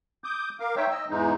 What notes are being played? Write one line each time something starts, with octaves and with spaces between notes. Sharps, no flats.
D6 D#6 G6
A#4 F5 D6
D#4 C5 C#5 E5 G5
D#5 E6
E2 G#2 E3 G#3 D#4